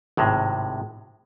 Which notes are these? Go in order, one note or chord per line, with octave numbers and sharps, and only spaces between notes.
G#1 A2 C3 G#3